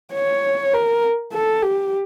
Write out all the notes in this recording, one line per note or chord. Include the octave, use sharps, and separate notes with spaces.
C#5
A#4
A4
G4